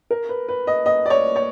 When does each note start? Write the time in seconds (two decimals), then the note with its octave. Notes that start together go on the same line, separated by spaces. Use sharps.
0.11 A#4
0.29 B4
0.49 B4
0.67 D#5
0.86 D#5
1.06 D5
1.10 C#5
1.36 C#5